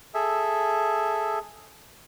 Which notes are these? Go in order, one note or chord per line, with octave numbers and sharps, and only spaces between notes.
G#4 A4 E5